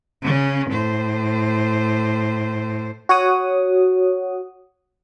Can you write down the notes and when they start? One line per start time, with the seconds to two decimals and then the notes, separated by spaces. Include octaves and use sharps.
0.22 C#3 C#4
0.71 A2 C5
3.09 F#4 C#5 F#5 D#6